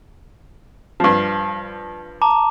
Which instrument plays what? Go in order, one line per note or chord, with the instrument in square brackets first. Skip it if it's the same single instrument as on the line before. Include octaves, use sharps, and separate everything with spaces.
[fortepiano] G2 F3
[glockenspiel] A5 A#5 D6